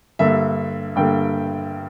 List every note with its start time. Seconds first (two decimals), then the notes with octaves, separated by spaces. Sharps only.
0.19 G2 D3 A#3 E5
0.96 G2 D3 A#3 G5